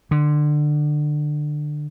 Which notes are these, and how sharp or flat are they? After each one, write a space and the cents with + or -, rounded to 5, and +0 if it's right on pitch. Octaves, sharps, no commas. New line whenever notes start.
D3 +25